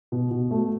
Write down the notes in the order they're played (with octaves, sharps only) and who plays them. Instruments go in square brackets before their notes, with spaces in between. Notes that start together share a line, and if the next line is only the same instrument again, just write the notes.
[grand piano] B2
B2
A3